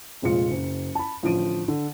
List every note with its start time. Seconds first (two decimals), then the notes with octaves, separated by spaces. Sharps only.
0.22 F1 A#1 G#3 F4 C#7
0.51 F#1
0.95 A5 B5
1.23 A1 D3 F3 D7 D#7
1.68 D3